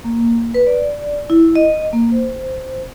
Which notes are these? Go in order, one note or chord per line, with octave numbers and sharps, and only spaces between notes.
A#3
B4
D5
E4
D#5
A#3
C5